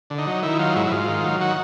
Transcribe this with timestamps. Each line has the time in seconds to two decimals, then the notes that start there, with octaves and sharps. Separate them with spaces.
0.10 D3
0.18 D#4
0.27 F#3
0.43 D#3 E4
0.59 F#3 F4
0.76 G#2 E4
0.87 E4
0.92 G#2 F4
1.08 D#3
1.24 F#3
1.40 D#3 F#4